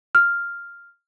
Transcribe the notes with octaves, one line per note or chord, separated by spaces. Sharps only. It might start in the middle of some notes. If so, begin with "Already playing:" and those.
F6